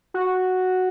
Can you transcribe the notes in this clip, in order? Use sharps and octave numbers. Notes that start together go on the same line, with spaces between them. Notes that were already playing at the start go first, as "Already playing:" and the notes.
F#4